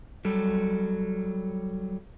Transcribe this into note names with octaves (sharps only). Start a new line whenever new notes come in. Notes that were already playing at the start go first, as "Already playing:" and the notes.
F#3 G3 A4